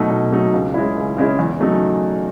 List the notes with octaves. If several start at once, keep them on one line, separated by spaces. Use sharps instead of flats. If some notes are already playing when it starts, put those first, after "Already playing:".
Already playing: B2 F#3 A3 D#4
B2
F#3 A3 D#4
C#2
C#3 G#3 C#4 E4
C#2
C#3 G#3 C#4 E4
E2
C#3 F#3 A3 D#4